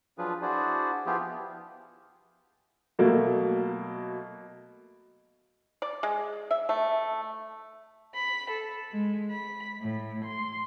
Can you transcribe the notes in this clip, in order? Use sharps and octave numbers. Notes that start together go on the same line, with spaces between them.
F3 F#3 D4 F4 G#4 B4
D4 E4 F#4 G#4 C5 D5
F3 B3 E4 F4 G4 G#4
B2 F#3 A3 A#3
D5
G#3
E5
A3
B5
A4
G#3
B5
A2
C6